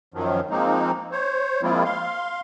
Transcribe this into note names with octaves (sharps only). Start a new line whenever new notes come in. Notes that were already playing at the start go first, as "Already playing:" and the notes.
F#2 D#3 F3 F#3
F3 G#3 A#3 C4 D#4
C5 C#5
F3 G#3 A#3 C4 E4 F4
F5 C6